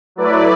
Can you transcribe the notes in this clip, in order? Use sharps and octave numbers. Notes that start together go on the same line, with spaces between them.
F#3 A3 E4 B4 D5